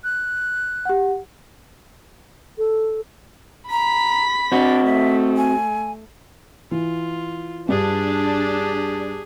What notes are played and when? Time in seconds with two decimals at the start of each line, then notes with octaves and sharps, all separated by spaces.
0.04 F#6
0.85 G4 F#5
2.58 A4
3.70 A#5 B5 B6
4.52 C4 D4 F#4
4.85 A3 E5
5.37 G#5
6.71 E3 F4
7.69 G2 D4 G4 G#4